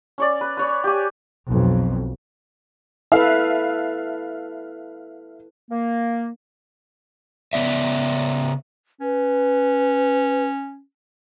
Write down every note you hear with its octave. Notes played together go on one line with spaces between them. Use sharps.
C#4 C#5 D5
B4
B4 C#5 D5
G4 G#5
B1 F2
E4 A4 B4 E5 F5
A#3
C#3 B3 D5 E5
C#4 B4